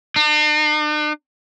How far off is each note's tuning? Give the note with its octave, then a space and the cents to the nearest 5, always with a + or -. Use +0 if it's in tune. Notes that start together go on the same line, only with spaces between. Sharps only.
D4 +45